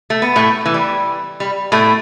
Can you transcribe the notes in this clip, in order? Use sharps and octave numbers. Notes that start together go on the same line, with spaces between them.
A3
B3
A2 A3
E3
G3
G3
A2 A3